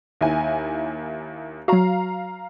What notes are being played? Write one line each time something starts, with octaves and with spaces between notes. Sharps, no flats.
D#2 E4 G#5
F#3 F#4 F5 A#5